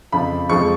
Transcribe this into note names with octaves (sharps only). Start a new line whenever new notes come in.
F2 C#3 F3 B5
F2 F3 G#3 C#6